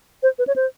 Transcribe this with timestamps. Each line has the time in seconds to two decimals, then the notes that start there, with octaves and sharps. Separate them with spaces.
0.23 C5
0.39 B4
0.47 C#5
0.56 C5